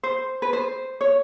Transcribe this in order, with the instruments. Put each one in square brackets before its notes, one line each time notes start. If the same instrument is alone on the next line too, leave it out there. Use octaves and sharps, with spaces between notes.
[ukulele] C5
B4
C5
C#5